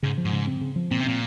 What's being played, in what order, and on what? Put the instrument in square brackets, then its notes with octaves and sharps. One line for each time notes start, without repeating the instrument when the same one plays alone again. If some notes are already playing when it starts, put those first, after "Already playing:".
[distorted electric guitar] G#2 [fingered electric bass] C#3
[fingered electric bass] F3
[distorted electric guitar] G#2
[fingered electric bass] C#3
C4
C#3
F3
[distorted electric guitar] A#2 [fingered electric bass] C4
[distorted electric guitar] C3
[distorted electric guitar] A#2 [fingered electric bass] C4